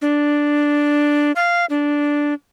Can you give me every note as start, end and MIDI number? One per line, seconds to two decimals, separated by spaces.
0.02 1.32 62
1.36 1.66 77
1.70 2.34 62